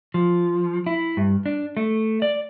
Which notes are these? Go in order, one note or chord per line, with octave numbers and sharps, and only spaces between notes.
F3
E4
G2
D4
A3
D5